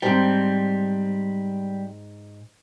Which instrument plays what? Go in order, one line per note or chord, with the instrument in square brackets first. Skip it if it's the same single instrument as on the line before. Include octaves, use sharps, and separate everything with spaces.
[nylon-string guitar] G#2 C5 A5 [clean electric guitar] G3 [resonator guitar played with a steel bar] C4 G5